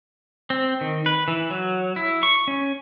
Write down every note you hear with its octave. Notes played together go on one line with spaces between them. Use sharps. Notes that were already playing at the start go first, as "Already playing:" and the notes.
C4
D#3
B4
E3
F#3
E4
C#6
C#4